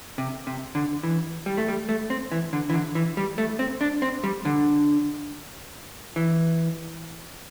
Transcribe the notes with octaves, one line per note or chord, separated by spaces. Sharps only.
C3
C3
D3
E3
G3
A3
G3
A3
C4
E3
D3
E3
D3
E3
G3
A3
C4
D4
C4
G3
D3
E3